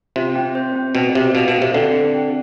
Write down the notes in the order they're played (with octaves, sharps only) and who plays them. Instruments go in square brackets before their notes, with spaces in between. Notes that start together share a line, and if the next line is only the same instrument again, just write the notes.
[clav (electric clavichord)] C3 [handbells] F4
[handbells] C4
C5
C4
[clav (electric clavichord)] B2 [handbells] C4
[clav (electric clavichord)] C3 [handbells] G4
[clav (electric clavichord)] B2 [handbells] F5
[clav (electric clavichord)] B2
[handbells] C4
[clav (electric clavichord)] C3
[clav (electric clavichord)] D3 [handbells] C4
[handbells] C4
C4